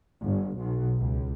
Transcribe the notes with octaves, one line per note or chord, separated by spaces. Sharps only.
G1
B1
C#2